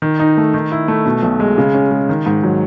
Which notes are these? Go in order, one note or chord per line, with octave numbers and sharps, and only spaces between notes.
D#3
D#4
A3
D#3
E4
A3
B2
B1
G#3
C#3
C#4
G#3
D#3
G#2
F#3